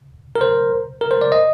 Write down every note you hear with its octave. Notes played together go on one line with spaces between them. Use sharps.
A#4
C5
A#4
C5
D5
D#5